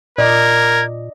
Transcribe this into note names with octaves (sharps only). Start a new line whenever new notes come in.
A#2 A#4 D5 D#5 G#6